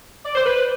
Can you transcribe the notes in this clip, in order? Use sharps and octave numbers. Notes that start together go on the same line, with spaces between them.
D5
C5
B4